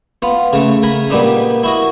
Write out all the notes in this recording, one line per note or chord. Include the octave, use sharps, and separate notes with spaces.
B3 F4
C#3 A3
A#4 G#5 B5
A#2 G3 B3 D4 D#4
E4 F#4 D#5